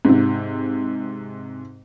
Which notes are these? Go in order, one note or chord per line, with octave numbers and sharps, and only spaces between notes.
G#2 C3